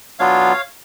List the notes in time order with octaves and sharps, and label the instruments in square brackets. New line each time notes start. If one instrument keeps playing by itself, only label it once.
[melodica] F#3 B3 D4 F4 C#5 F5